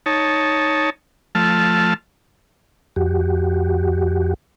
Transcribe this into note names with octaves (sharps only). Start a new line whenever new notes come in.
D#4 C#5 A5
F3 A3 A5 F6
F2 F#4 G4